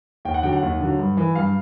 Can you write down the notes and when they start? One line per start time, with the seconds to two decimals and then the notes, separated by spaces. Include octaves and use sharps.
0.25 D#2 G5
0.34 F#5
0.43 D3 F#3 G5
0.53 F#5
0.63 D#2
0.80 D3 F#3
0.99 G2
1.17 E3
1.35 G2 F5